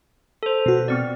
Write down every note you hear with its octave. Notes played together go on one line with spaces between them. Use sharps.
A4 C5
B2 F#4
B3 C4 D5